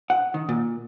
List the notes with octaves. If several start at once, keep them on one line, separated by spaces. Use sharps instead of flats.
F#5
D#3
A#2